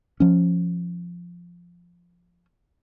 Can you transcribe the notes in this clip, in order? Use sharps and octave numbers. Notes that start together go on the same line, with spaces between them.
F3 C#4